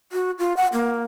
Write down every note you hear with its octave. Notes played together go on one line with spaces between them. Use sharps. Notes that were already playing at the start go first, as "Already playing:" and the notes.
F#4
F4
F#5
A#3